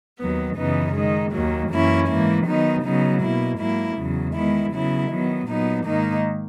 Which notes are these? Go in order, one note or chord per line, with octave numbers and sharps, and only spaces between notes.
D#2 D#3 F#3 B3
F#2 C#3 E3 B3 D#4
D#3 G#3 D#4
D#2 D#3 F#3 A#3
F#2 E3 A#3 C#4 E4
G#2 E3 A#3 E4
D#3 F#3 B3 D#4
C#3 F#3 B3 D#4
B2 A#3 E4
G#2 F#3 A#3 E4
E2 C#3 F#3
D#3 G#3 B3 E4
C#3 F#3 B3 E4
D#3 F#3 B3
A#2 F#3 B3 D#4
G#2 D#3 A#3 D#4